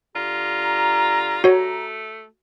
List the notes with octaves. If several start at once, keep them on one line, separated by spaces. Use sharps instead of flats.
D3 F4 G4 A#5
A3 F#4 C#5